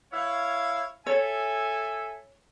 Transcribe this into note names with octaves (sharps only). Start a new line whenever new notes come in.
E4 C#5 F5
A4 C#5 E5 G#5